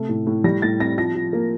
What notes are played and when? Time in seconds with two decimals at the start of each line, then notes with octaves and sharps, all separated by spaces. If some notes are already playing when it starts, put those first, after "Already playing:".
Already playing: C3 A3
0.09 A2
0.27 A2
0.44 G3 A#6
0.62 A2 A6
0.80 C4 A#6
0.98 F3 A#6
1.15 F3
1.33 A#3